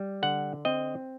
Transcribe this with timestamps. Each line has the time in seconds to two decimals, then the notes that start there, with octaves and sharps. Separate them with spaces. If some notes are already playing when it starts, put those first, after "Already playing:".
Already playing: G3
0.22 D3 F#5
0.65 C4 D#5